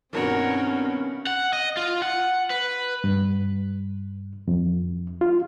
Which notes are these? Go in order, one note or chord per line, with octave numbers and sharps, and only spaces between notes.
G2 B2 D#3 C4 C#4 F#4 A#4 C#5
F#5
D#5
F4
F#5
B4
G2
F2
F4